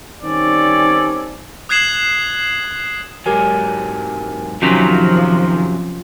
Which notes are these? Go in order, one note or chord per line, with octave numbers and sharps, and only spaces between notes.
D#3 G3 C4 C#4 A4 D5
D#6 F#6 G#6 C7 E7 F#7
G#2 F#3 G4 A#4 G#5
F#2 C3 D#3 F3 F#3 C#4 F4